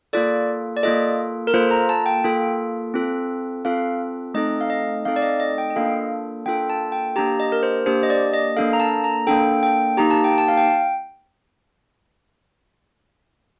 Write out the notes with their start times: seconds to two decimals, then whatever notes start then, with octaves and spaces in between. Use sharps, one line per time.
0.13 A#3 F4 A4 D5
0.77 D5
0.83 A#3 F4 A4 D#5
1.47 A#4
1.54 A#3 F4 A4 C5
1.71 A#5
1.89 A5
2.06 G5
2.24 A#3 F4 A4
2.94 C4 F4 A4
3.65 C4 F4 A4 F5
4.34 A3 C4 D#4 A4 D#5
4.61 F5
4.70 D#5
5.05 A3 C4 D#4 A4 F5
5.16 D5
5.22 D#5
5.40 D#5
5.58 G5
5.70 D#5
5.76 A#3 D4 F4 A4 F5
6.46 A#3 D4 F4 A4 G5
6.70 A5
6.92 G5
7.16 A#3 D4 G4 A#5
7.40 D#5
7.52 A#4
7.63 C5
7.86 A#3 D4 G4 C5
8.03 D#5
8.10 D5
8.34 D#5
8.57 A#3 D4 A4 F5
8.73 A#5
8.80 A5
9.04 A#5
9.27 A#3 D4 A4 G5
9.63 G5
9.97 A#3 D#4 G4 A#5
10.11 A5
10.24 G5
10.38 A5
10.48 F5
10.57 G5